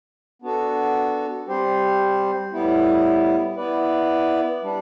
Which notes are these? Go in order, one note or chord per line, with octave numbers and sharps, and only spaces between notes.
B3 D4 F#4 A4
G3 C4 G4 C5
A2 G3 B3 E4
B3 E4 B4 D5
G3 D4